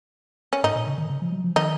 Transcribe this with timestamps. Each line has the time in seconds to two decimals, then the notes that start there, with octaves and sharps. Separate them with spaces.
0.53 C#4
0.63 G#2 D#4
0.76 A#2
0.87 C#3
0.98 D#3
1.10 C#3
1.22 F3
1.32 F#3
1.44 F3
1.56 D#3 D#4